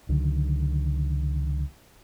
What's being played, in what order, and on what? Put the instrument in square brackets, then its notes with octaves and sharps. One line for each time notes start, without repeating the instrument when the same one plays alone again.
[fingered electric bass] C#2 D3 D#3 F#3